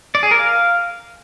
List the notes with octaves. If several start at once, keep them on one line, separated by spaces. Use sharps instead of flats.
D5
G#4
A#4
F5